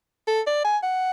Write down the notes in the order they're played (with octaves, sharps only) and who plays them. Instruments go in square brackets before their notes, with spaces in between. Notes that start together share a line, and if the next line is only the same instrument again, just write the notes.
[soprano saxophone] A4
D5
G#5
F#5